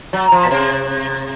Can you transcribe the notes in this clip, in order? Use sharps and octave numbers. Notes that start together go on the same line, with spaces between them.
F#3
F3
A#2
C3